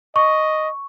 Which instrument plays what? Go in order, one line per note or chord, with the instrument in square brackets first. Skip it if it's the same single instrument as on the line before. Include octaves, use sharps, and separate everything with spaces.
[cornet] D#5 [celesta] C#6